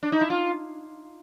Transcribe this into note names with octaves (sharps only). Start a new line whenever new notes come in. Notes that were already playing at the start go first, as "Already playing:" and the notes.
D4
D#4
E4
F4